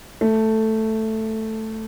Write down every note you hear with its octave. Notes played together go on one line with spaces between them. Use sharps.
A3